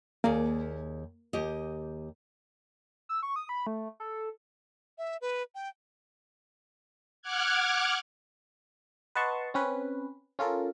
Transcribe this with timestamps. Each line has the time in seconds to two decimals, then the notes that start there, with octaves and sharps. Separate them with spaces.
0.24 D#2 A#3 G#4 D5
1.33 D#2 G4 D#5
3.09 E6
3.23 C#6
3.36 D#6
3.49 B5
3.67 A3
4.00 A4
4.98 E5
5.21 B4
5.55 G5
7.22 F#5 D6 F6 F#6 G#6
9.15 B4 D#5 F#5 A5 C6 C#6
9.54 C4 C#4 B4
10.39 C#4 F4 A4 A#4